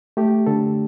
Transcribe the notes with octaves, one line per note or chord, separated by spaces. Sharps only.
A3 G4
D3 A4